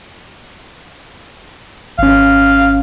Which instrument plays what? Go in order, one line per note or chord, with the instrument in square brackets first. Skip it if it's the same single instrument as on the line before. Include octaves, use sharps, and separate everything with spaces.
[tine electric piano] G#1 C#4 [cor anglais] F5